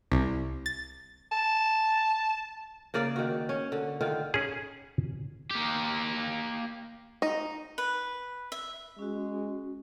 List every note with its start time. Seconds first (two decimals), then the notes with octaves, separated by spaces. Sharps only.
0.12 C2
0.66 A6
1.32 A5
2.94 C#3 A#3 D5 F5
3.16 D#3 F#4
3.49 C#4
3.72 D3
4.01 D3 D#3 F4
4.34 C#4 G#4
5.51 A#3 G4
7.22 D#4
7.78 B4
8.52 E5
8.99 G#3 C#4 F#4